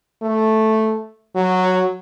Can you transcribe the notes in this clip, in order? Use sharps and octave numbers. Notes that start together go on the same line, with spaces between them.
A3
F#3